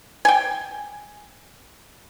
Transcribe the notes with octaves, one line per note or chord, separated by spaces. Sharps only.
G5 G#5